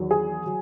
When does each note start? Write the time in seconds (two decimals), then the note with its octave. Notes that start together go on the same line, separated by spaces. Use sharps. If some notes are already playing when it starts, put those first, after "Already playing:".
Already playing: E2 D#3 F#3
0.11 G#4
0.46 F#3